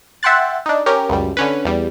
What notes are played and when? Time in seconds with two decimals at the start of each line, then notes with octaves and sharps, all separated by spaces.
0.23 E5 F#5 G5 C6 F#6 A6
0.66 D4 D#4
0.86 C#4 G4 A#4
1.09 C#2 F#2 G3
1.37 D3 C#4 B4
1.65 E2 G3